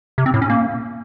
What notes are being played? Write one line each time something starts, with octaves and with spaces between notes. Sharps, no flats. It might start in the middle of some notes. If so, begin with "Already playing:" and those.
C3
C4
A2
C#4
A#3